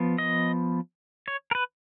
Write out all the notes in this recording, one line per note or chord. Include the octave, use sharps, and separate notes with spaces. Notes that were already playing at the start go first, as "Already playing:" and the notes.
Already playing: F3 B3
D#5
C#5
A#4
B4